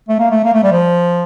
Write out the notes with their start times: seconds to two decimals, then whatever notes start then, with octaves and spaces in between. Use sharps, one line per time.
0.09 A3
0.19 A#3
0.31 A3
0.44 A#3
0.53 A3
0.63 G3
0.72 F3